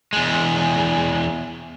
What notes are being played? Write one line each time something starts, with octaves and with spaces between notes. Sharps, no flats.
E2 G#3